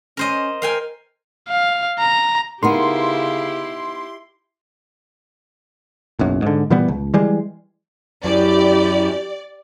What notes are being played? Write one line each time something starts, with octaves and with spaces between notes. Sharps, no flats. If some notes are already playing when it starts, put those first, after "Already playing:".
C#4 A#4 C5 D#5
A#4 F5 G5 G#5
F5
A#5
C#3 B3 D#4 E4 G4 A#4 C6 C7
F#1 B1 F#2
G#2 D3
A#2 E3 G3 B3
C#2
E3 G3 G#3
F#2 E4 G4 D5